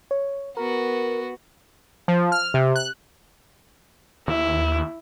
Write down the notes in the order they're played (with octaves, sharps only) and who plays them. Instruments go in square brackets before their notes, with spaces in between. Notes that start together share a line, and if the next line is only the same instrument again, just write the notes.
[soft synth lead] C#5
[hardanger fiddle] B3 F#4 [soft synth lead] A#4
[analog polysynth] F3
F6
C3
F#6
[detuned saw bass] D#2 [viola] E4